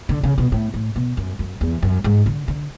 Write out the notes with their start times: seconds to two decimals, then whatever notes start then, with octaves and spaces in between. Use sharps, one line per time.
0.09 D3
0.23 C#3
0.38 B2
0.52 A2
0.74 A2
0.96 B2
1.17 F#2
1.39 F#2
1.61 E2
1.82 F#2
2.04 G#2
2.26 D3
2.48 D3